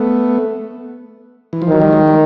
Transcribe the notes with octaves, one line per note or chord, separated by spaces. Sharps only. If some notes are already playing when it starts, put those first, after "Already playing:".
Already playing: A3 B3
E3
F3
D#3 F#3
G3
F#3 G#3
G3